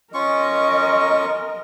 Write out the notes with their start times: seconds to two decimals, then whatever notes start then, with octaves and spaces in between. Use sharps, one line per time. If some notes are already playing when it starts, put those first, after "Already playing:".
0.14 C#4 F4 A#4 D#5 C#6